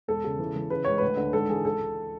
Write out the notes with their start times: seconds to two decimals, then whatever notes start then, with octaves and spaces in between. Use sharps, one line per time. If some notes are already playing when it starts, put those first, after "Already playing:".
0.08 E1 A4
0.24 C#3
0.39 E3
0.56 E3
0.70 C#3 B4
0.85 C#2 C#5
0.98 D2 B4
1.17 D3
1.33 G#1 A4
1.49 E3 G#4
1.64 C#2 A4
1.80 C#2